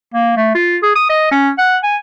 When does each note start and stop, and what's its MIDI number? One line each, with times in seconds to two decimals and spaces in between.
0.14 0.35 58
0.37 0.51 57
0.55 0.78 65
0.83 0.93 68
0.96 1.08 87
1.10 1.27 75
1.32 1.50 61
1.58 1.77 78
1.83 1.97 80